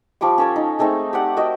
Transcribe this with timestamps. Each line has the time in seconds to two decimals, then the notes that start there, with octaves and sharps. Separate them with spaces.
0.21 F3 G3 C#6 D6
0.38 C#4 A4 C#5
0.56 D#4
0.79 G#3 A3 C4 D#4
1.13 G4 D5 F#5
1.37 F#4 A#4 D#5 G5